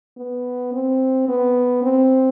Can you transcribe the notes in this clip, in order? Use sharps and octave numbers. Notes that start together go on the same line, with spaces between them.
B3
C4
B3
C4